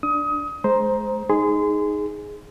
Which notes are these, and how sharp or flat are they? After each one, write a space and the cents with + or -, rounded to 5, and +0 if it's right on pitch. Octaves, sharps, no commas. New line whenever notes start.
D4 +0 D#6 +25
G#3 +25 C5 +0 A#5 +10
D#4 +0 G#4 +0 C6 -30